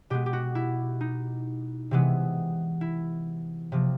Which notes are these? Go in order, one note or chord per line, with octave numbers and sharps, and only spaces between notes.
B2 G#3 B3 G4
G4
F#4
E4
D#4
C3 E3 G#3 B3
E4
C3 F3 A#3